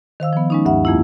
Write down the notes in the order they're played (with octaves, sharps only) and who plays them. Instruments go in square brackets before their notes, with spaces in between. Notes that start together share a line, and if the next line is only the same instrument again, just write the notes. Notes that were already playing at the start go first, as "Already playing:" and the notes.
[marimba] D#3 C5 F5 E6
F3 B3
G#3 C#4 D#4
D2 G2 E5 F#5
F2 A#3 E4